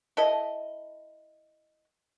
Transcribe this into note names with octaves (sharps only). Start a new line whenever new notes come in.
E4 A4 D#5